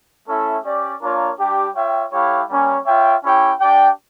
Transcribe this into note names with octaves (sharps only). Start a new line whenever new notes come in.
A3 C#4 E4 A4 E5
C#4 G4 D5
A#3 D4 F4 A#4 C#5
G3 D4 G4
F4 C#5 E5 G5
A3 E4 G4 C#5 F5
G3 A#3 C#4
F4 C#5 E5 G5
C#4 E4 G4 C#5 G5
D4 G4 D5 G5